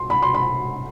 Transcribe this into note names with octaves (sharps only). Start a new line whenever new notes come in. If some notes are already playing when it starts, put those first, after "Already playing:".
Already playing: C6
B5
C6
B5